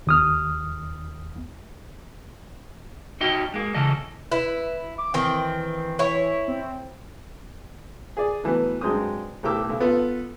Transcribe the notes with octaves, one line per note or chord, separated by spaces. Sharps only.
D#2 D#6 F6
D#4 F#4 G4 D#5
G#3 A#3
C#3 E3 A4 D#5
E4 B4
D6
D#3 E3 C4
E4 C#5
C4
G#4 D5
A2 E3 F#3 B3
G2 F#3 G#3 C4 D#6
B1 A2 G4 A#4 D6 E6
B1
B3 F4 A4